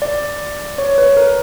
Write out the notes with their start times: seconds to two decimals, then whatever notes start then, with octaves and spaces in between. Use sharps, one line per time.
0.02 D5
0.78 C#5
0.98 B4
1.17 A#4